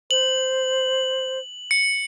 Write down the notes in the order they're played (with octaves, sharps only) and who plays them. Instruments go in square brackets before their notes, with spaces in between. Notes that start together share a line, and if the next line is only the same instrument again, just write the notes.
[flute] C5 [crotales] F#7
[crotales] C#7